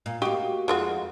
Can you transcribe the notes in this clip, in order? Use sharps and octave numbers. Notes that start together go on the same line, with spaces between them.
A#2
A#3 F#4 G4 D#5
F2 G#3 F4 F#4